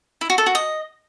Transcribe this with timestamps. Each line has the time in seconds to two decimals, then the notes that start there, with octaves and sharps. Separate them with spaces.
0.21 E4
0.30 F#4
0.38 A4
0.46 F#4
0.55 D#5